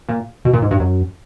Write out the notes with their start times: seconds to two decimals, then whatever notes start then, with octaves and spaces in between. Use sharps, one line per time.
0.09 A#2
0.45 B2
0.53 A#2
0.62 G#2
0.71 G2
0.80 F#2